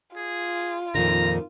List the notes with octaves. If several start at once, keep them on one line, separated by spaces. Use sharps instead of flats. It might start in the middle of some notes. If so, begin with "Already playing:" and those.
F4 G#4
F2 A#2 D#3 A#5